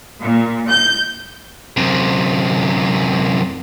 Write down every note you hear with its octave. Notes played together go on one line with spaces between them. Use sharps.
A#2
G6
F#2 C3